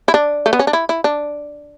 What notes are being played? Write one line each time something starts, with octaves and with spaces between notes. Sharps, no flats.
E4
D4
A3
B3
C#4
D4
E4
E4
D4